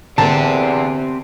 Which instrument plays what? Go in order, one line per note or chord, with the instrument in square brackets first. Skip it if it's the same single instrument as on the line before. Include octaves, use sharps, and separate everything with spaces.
[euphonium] E2 [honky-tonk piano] D3 A#3 [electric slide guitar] C4 G4 [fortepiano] A5